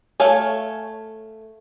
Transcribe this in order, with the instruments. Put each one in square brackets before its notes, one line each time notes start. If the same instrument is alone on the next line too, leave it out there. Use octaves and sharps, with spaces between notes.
[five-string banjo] A3 C#5 F5 G#5